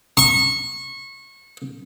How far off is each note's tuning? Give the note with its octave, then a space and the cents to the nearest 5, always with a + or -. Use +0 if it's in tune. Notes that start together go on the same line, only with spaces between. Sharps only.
C#6 -25